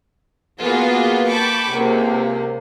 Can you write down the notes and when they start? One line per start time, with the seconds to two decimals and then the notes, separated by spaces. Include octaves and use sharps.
0.61 A#3 B3 F4 F#4 G#4 B4
1.29 G5 A5 B5 C#6 D6
1.69 C#2 C3 A#3